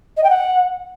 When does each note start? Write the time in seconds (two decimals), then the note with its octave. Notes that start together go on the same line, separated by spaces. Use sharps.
0.17 D#5
0.24 G5
0.30 F#5